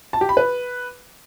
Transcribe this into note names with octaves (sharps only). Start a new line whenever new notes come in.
A5
G4
B5
B4